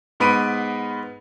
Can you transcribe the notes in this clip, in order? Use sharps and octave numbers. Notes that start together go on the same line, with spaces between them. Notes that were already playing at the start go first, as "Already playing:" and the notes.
G#2 B3 B5 D7 D#7